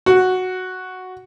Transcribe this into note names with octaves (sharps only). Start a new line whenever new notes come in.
F#4